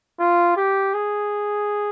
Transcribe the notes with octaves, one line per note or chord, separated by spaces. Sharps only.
F4
G4
G#4